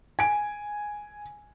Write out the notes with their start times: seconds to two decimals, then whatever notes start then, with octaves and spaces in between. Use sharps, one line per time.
0.19 G#5 D7